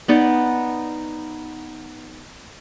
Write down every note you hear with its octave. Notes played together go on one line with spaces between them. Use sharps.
B3 D#4 D5 F#5